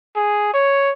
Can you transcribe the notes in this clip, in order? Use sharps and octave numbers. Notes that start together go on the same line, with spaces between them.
G#4
C#5